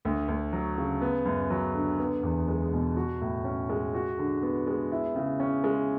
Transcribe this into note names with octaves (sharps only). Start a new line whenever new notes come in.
D2
D2
F#3
C#3
B3
F#2
F#3
D3
B3
E2
G#3
B2
F#4
A2
C#4
G#3
F#4
D3
B3
G#3
E4
C#3
C#4
G#3